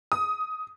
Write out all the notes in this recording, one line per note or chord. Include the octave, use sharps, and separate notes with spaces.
D#6